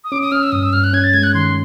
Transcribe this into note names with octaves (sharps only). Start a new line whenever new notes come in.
D#6
C#4 D6
D#6
C#4 F6
E6
G2 D#6
E6
G2 F6
F#6
C#4 G#6
A6
G#3 G#6
F#6
D#3 C6